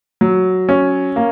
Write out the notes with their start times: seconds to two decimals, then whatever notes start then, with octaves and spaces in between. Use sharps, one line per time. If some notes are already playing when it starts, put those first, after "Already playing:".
0.21 F#3
0.69 C#4
1.16 A#3